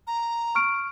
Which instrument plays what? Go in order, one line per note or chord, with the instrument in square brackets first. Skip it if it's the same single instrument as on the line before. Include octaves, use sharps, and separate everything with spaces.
[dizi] A#5
[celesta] C#6 F6 D7